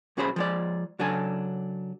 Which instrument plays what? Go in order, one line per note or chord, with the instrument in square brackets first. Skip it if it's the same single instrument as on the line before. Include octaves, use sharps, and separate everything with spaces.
[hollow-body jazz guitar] B1 C#4 F#4 G#4 C5 B5
F3 G#3 D5
C#3 F#3 D4 A4 G#5